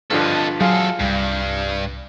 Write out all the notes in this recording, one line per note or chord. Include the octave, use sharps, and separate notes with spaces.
G2 D3 F3 A4 D#5
F#2 F#3 F4 G#4 A4
C2 G2